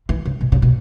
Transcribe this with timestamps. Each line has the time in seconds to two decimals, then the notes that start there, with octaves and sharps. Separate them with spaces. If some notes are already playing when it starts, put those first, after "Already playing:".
0.09 E3
0.25 C#3
0.41 B2
0.52 C#3
0.62 B2